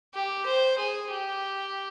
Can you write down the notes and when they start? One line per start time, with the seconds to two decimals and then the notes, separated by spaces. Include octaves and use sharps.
0.15 G4
0.46 C5
0.79 G#4
1.11 G4